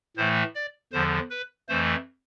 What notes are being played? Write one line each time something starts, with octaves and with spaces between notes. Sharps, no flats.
A2 E3 A3 C5
D5
E2 D3 F3 C5
B4
F2 E3 A3 C5